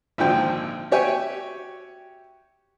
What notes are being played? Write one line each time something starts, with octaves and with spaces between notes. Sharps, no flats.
G#1 A#2 D3 F3 G5
F#4 G4 C#5 E5 G5 G#5